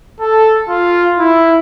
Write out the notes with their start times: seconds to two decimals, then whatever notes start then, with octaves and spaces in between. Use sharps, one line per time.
0.20 A4
0.69 F4
1.18 E4